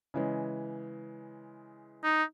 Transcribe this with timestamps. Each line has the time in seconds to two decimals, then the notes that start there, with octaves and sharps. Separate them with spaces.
0.14 C#3 E3 G#3
2.04 D#4